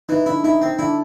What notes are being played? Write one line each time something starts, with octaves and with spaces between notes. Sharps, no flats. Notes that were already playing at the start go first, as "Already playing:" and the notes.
E3 D#4
D4 E4
D#4 E4
C4
D4 E4